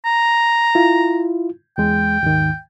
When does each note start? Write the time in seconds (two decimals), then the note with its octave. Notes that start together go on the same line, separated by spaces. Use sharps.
0.06 A#5
0.75 E4 F4
1.78 E2 G#3 G5
2.23 D#2 G#2 D#3